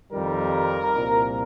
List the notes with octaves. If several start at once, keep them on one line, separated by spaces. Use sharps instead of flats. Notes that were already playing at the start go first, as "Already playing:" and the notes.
F2 D#3 G3 A#4
C2 A#2 F3